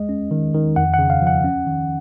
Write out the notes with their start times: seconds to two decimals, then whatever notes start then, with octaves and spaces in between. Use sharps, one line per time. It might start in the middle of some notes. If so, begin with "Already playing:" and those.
Already playing: G#3 D#5
0.09 C#4
0.31 D#3
0.54 D#3
0.76 F2 F#5
0.94 C#3 F#5
1.10 F5
1.22 F3
1.27 F#5
1.44 C#4
1.67 D#3